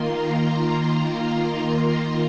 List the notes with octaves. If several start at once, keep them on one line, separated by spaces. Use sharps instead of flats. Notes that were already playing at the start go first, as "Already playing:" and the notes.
Already playing: D#3 A#3 F4 C6
A#5
A#5